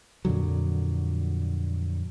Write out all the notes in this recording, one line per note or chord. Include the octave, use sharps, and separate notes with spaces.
F2 A#2 D3 F#3